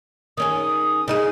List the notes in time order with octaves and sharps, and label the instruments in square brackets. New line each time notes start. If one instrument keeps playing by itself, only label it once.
[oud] D#3 C#4 G#4 [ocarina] D#6
[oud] C#3 D#4 G#4